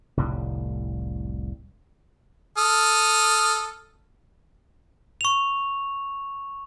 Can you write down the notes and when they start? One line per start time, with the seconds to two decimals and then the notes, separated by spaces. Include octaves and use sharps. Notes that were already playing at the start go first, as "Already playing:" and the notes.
0.17 F1 C2 A2 G3
2.58 A4 D#6 F6
5.21 C#6 F7